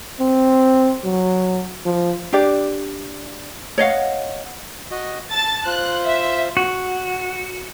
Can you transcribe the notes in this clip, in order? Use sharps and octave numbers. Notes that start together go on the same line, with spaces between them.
C4
F#3
F3
D4 G4 D5
C#5 D#5 F5 F#5
F#4 D#5
A5 E6 A6
F4 C5 F#6
E5
F#4